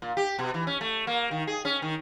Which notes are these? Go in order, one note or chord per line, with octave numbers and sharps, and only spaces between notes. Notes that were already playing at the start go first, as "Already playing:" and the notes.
A#2
G4
B2
E3
C#4
A3
A#3
D#3
G#4
C#4
D#3